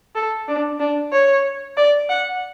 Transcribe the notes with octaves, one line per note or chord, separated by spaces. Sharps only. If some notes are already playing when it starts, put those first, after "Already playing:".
A4
D4
D4
C#5
D5
F#5